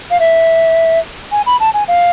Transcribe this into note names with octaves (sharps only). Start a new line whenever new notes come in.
F5
E5
G#5
B5
A5
G#5
F5